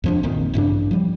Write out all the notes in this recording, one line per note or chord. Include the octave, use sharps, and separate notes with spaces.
F2 F3 D4
A#1 A#2 D#3 C4
A1 G2 C#3 D4
F3 G3